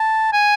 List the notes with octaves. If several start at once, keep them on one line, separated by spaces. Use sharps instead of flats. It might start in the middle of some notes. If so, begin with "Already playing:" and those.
Already playing: A5
G#5